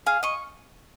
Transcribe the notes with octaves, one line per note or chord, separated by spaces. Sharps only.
G#4 F5
D#5 C#6